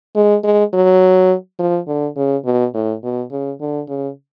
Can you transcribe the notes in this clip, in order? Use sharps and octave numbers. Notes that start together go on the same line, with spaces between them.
G#3
G#3
F#3
F3
D3
C#3
B2
A2
B2
C#3
D3
C#3